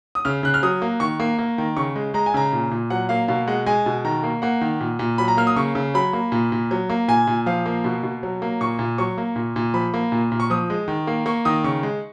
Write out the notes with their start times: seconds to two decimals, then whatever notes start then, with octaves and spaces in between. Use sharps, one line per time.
0.15 D#6
0.25 C#3 F6
0.43 C#3 F#6
0.54 F6
0.63 F#3 D#6
0.82 A#3
1.00 D#3 C#6
1.20 A#3
1.39 A#3
1.58 D#3
1.77 C#3 C#6
1.96 G#3
2.14 G#3 A#5
2.26 G#5
2.34 C#3 A#5
2.52 A#2
2.71 A#2
2.90 F#3 F#5
3.09 A#3 F5
3.28 B2 F5
3.47 G#3 F#5
3.66 G#3 G#5
3.86 B2
4.05 D#3 A#5
4.23 A#3
4.42 A#3 F#5
4.61 D#3
4.81 A#2
4.99 A#2
5.18 F#3 B5
5.28 A#5
5.37 A#3 F6
5.47 D#6
5.56 C#3 C#6
5.75 C#3
5.94 F#3 B5
6.13 A#3
6.32 A#2
6.52 A#2
6.71 F#3
6.90 A#3
7.08 A#2 G#5
7.27 A#2
7.46 F3 F5
7.66 A#3
7.84 B2
8.03 B2
8.23 F#3
8.42 A#3
8.61 A#2 C#6
8.79 A#2
8.98 F#3 C#6
9.18 A#3
9.36 A#2
9.56 A#2
9.74 F3 B5
9.94 A#3
10.12 A#2
10.32 A#2
10.40 C#6
10.50 F3 D#6
10.70 G#3
10.88 D#3
11.07 A#3
11.26 A#3 C#6
11.45 D#3 D#6
11.64 C#3 C#6
11.83 G#3